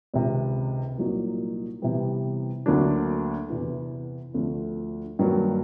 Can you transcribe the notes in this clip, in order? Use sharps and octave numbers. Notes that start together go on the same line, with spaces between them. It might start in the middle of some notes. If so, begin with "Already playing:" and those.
C#2 C3 D#3
C2 A#2 F#3 A#3 D#4
C3 E3 G3 B3
D2 D3 F#3 A#3 D4
E2 C3 E3
D2 D3 F3 A3
G2 D#3 F#3 A#3